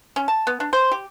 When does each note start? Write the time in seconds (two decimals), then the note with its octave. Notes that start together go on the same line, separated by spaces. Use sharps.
0.16 C#4
0.28 A5
0.47 B3
0.60 D4
0.73 C5
0.91 G4